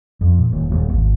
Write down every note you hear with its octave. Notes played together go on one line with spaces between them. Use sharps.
F2
A#2
D#1
D#1
G#1